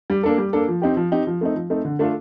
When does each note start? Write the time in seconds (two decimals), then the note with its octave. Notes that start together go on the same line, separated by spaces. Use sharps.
0.10 G3
0.23 A#3 D4 A4
0.38 G3
0.53 A#3 D4 A4
0.68 F3
0.82 C4 D#4 G4
0.97 F3
1.12 C4 D#4 G4
1.27 F3
1.41 A3 C4 D#4
1.56 F3
1.70 A3 C4 D#4
1.85 D3
1.99 A3 D4 F4 A4